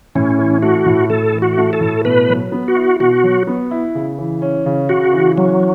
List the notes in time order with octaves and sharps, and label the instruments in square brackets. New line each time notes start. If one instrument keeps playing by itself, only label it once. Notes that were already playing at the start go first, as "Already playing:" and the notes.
[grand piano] A2 [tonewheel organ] C#4
[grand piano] E3
[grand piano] A3 [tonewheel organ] F#4
[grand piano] A2
[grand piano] A2 [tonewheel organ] A4
[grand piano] E3
[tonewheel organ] F#4
[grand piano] A3
[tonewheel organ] A4
[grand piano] A2
[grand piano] B2 [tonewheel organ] B4
[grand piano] F#3
B3
[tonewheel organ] F#4
[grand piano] E4
[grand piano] B2 [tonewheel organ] F#4
[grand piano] F#3
B3
E4
C#3
E3
C#4
C#3
[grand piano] C#3 [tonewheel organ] F#4
[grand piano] E3
[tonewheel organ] F#3 [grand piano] C#4